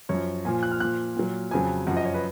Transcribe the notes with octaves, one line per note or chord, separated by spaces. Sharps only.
F#2 F3 C#5
A#2 F3 G#5
F#6
F6
A#2 F3 F#6
A#2 F#3
F2 C#3 F#3 G#5
F#2 F3 F#5
D#5
C#5
B4